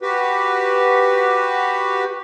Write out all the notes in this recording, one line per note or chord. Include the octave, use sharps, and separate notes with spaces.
F#4 G4 B4